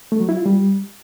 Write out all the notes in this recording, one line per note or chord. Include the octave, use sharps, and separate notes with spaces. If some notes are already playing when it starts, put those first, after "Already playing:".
A3
F#3
E4
F4
G3